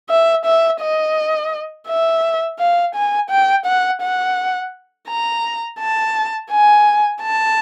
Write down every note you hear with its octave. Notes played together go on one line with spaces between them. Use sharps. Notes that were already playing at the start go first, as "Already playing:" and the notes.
E5
E5
D#5
E5
F5
G#5
G5
F#5
F#5
A#5
A5
G#5
A5